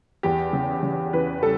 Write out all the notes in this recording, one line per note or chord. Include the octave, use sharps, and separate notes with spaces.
E2 G4
C#3
C#3
E3 B4
G3 A4